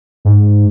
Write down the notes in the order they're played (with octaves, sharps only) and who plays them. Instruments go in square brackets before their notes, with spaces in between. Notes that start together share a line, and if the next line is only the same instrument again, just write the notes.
[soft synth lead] G#2